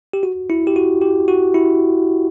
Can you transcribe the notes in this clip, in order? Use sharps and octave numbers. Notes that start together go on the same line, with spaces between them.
G4
F#4
E4
G4
F#4
G4
F#4
E4